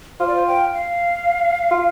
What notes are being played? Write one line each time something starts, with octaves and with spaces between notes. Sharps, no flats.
F4 C5
D5
C5
G5
F5
F4